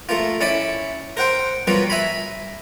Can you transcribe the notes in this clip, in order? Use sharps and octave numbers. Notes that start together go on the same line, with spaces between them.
A3 A#3 F4
C#4 E4 D5 E5
A#4 C5 F#5 G5 C6
F#3 G3 A#3 B3 F4 F#4
E5 G#5 A#5 B5